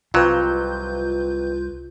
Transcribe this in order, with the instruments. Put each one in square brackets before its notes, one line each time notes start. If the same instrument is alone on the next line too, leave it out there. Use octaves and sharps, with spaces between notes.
[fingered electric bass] C2 [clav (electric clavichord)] F2 C3 F#3 [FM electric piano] F4 B4 G6